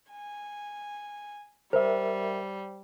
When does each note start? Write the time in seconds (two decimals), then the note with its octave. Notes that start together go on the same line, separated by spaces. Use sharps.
0.11 G#5
1.73 G3 A#4 C5 E5